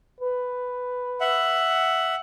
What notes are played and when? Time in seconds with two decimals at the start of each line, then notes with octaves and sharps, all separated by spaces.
0.21 B4
1.21 E5 F#5